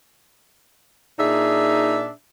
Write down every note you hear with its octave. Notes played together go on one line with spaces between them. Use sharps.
A#2 D4 D#4 G#4 E5